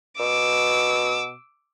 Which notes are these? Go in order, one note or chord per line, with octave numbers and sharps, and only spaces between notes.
B2 D6 E6